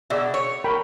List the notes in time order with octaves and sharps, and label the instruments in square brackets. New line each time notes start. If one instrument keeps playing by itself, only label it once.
[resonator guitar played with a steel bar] B2 [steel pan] G#4 D5 E5
[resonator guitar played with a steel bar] C#5
[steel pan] A#4 G5 B5